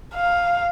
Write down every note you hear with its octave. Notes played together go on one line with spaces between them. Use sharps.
F5